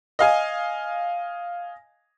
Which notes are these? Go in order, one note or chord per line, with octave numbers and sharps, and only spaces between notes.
D#5 F5 G#5